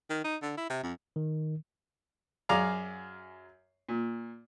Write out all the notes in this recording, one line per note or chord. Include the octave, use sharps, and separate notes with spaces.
D#3
D#4
D3
E4
C3
F2
D#3
F#2 G#4 D5 F5 A#5
A#2